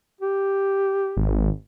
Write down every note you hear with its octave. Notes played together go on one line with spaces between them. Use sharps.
G4
G#1